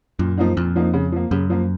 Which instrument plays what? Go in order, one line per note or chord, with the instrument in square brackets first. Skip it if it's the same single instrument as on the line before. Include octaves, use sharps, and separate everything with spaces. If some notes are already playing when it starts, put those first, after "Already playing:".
[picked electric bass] F#2 [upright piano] A#2
[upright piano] F3 A#3 D#4
[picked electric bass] F2 [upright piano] A#2
[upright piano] F3 A#3 D#4
C#3
F3 A#3
[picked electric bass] F#2 [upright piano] C#3
[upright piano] F3 A#3